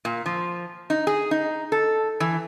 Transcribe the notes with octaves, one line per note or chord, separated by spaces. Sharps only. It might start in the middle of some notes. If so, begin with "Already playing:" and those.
A#2
F3
D#4
G#4
D#4
A4
E3